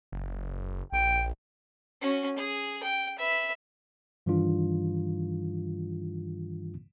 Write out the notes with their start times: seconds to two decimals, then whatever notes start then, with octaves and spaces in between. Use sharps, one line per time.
0.12 F#1
0.92 A#1 G5
2.01 C#4 F#4
2.36 G#4
2.83 G5
3.18 B4 E5
4.26 G2 D#3 E3 G3 D4 F4